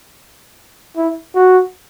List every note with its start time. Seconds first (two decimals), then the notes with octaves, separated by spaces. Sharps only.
0.97 E4
1.35 F#4